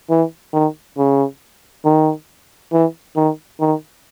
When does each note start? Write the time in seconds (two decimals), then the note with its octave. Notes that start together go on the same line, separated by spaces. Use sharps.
0.10 E3
0.53 D#3
0.97 C#3
1.85 D#3
2.72 E3
3.16 D#3
3.60 D#3